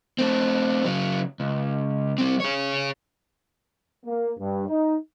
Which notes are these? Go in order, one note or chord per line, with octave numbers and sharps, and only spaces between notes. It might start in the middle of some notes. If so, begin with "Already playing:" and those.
A3 C4
C#3 F#3
C#2
G3 C4
G#4 C#5
A#3
G2
D#4